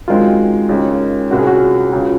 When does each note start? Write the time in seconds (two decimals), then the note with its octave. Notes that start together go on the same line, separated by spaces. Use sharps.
0.08 F#2 D#3 G#3 C4 D#4 F4
0.69 D#2 C#3 G#3 C#4
1.30 C2 A#2 F#3 C#4 F#4
1.39 G#4
1.47 F#4
1.92 C#2 C#3 F3